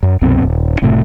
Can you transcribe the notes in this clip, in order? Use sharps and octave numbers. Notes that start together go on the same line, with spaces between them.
F#2
C2 F#2 B2 C4
D#1
F#1 A2 C3 A3